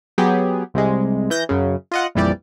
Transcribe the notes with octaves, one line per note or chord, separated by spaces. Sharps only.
F#3 B3 G4 G#4
C2 C3 G#3
E3 G6 A#6
F#2 C#3
F4 D#5 F#5
A#1 F2 E3 G3 G4 D5